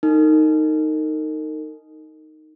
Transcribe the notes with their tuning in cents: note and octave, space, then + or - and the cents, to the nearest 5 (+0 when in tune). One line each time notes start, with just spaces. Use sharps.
D#4 +0 A#4 -40